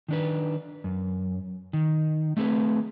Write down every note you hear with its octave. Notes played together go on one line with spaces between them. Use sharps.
D#3 D4 B4
F#2
D#3
A3 C4 G#4 B4